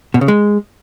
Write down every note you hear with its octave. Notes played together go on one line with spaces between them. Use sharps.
B2
C#3
G#3